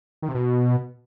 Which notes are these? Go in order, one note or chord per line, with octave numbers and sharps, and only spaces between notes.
D#3
C3
B2